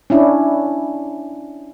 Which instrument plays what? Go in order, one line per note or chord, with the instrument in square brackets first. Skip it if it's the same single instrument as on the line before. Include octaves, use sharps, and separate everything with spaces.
[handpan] C#4 D4 E4